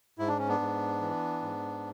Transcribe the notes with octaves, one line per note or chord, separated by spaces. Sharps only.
G#2 E4
D4
C#4
B3 D4
G#2
E3
G#2